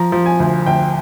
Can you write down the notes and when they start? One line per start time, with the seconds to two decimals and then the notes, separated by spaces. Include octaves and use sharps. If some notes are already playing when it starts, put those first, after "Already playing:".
Already playing: F3 A#5
0.12 F3
0.26 G#5
0.40 D2
0.66 D2 G5